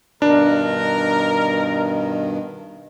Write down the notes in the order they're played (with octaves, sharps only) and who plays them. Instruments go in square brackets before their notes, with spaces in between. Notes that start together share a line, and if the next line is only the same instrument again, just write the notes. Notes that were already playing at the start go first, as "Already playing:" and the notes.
[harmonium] G2 B2 D#3 [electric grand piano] D4 [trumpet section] A#4